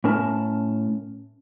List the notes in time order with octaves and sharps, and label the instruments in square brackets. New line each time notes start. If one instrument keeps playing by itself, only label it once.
[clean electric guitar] A2 C#4 A#4 A5